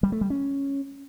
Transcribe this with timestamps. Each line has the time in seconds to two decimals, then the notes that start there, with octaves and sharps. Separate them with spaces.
0.03 G3
0.12 A3
0.21 G3
0.30 C#4